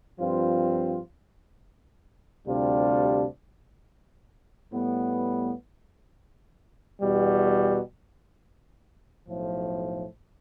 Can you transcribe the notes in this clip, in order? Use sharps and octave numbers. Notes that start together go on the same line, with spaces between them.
G2 F3 C4 F4
D2 C3 G3 D4 F4
A2 G3 B3
E2 B2 G3
B1 A2 F3